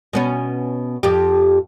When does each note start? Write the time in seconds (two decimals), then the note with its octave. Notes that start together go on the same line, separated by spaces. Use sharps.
0.13 B2 B3 C#4
1.03 F2 G4